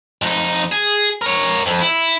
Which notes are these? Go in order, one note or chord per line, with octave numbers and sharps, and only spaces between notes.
F2 D#4
G#4
A#4 C#5
F2
E4